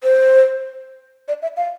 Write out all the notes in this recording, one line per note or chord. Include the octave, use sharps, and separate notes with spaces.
C5
D5
E5
F5